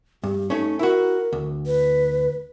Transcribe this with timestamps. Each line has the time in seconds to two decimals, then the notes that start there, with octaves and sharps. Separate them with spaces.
0.23 G2 G4
0.50 A3 C#4 D#4
0.79 E4 F#4 A#4
1.33 D2
1.66 B4